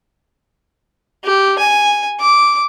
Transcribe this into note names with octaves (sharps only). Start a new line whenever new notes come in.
G4
G#5
D6